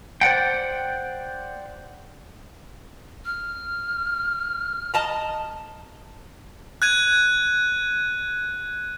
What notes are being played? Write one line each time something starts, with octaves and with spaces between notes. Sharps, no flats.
C5 D5 F#5 G5
F6
D#5 A5 A#5
F#6 G#6 D#7